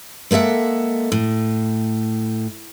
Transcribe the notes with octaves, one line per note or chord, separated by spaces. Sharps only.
G#3 A#3 A4 E5 F#5
A2